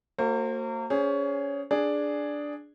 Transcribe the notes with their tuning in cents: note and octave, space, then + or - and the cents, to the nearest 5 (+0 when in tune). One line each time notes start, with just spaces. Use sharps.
A#3 -35 F#4 +0 C5 +30
C#4 +25 G#4 +0 C5 +20
D4 +0 G#4 +0